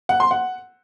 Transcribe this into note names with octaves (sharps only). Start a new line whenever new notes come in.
F#5
C6
F#5